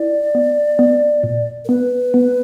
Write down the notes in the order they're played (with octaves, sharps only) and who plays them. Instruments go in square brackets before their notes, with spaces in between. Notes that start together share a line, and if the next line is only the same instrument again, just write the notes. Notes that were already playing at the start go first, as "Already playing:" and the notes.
Already playing: [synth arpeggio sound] E4 [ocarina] D5
[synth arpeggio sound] B3
B3
A#2
[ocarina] A#4
[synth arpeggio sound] B3 [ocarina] B4
[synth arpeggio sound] B3